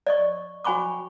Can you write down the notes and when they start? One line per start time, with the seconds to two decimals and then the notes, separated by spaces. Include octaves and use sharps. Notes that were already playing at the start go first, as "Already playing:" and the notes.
0.07 D5 D#5 C#6
0.64 F#4 G5 G#5 B5 C#6 D6